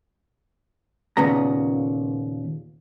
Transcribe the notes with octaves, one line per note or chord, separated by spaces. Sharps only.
D#2 A#2 C#3 B3 A#5